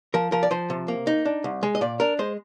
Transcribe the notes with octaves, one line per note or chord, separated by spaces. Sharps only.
F3 A#4
F3 A#4
D5
F3 C5
C3
A#3
D#4
D4
C2
G#3
D#5
A#2 D5
D4 A#4
G#3 C5